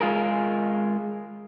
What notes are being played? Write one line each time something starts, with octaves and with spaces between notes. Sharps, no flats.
G#3 F4 G#4 A#4